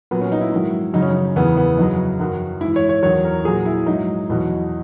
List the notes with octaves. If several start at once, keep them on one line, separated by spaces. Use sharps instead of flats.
A#2 F#3 B3
C#4
D#4
E4
G#2 D#3 F#3
F#2 C#3 F#3 D#4
C#4
D#4
E2 C#3 E3 B3
B3
F#2 C#3 F#3 D#4
F#2 D#3 F#3
G#2 E3 E4
C#5
C#5
E2 D#3 F#3 C#5
A#4
A#2 F#3 G#4
E4
G#2 F#3 D#4
E2 B2 F#3